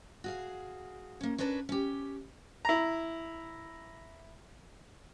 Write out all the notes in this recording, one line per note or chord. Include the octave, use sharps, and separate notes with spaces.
F#4 G#4 F5
A#3 C#4
C#4 D4 A#4 B4 A5
C#4 G4
E4 A#5